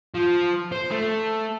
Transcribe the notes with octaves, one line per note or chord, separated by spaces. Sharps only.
F3
C5
A3